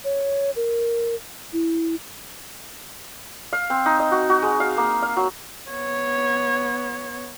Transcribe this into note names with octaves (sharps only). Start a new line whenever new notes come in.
C#5
A#4
E4
F5
C4
D#4
D#5
F#4
F#4
G#3
F5
A#3
F5
F#3
B3 C#5